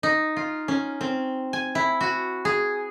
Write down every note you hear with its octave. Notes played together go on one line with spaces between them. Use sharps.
D#4
F4
C#4
C4
G#5
E4
F#4
G#4